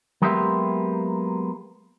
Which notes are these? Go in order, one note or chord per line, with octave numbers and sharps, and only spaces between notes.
F#3 G#3 A#3 B3 G4 E5